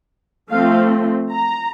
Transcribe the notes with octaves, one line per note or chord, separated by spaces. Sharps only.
F3 A3 C4 F5
A#5